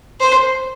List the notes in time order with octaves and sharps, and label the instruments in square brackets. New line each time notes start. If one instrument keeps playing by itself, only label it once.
[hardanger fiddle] C5